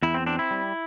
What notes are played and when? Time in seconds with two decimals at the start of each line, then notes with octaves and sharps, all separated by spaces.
0.03 E2 E4
0.14 C4
0.26 C4 D4
0.39 E4
0.51 G3